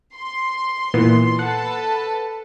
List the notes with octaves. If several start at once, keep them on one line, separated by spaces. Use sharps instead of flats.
C6
A#2 E3 B3
A4 B4 F#5 A5